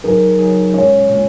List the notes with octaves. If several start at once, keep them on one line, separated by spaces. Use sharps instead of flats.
F#3 D#4 G#4 A#4
F#3 D#4 G#4
A#2 G#3 C#4 C#5
A#2 G#3 C#4